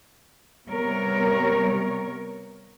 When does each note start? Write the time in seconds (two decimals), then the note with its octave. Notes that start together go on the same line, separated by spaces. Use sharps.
0.68 C3 G3 B3 A#4 C#5